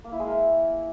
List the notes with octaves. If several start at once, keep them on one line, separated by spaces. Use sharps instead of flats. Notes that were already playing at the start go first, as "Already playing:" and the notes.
A#3
E4
G#3
A#4